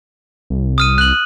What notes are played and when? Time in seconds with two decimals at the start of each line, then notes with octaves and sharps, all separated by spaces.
0.50 C2
0.78 D#6 F6 D#7
0.98 F#6 F#7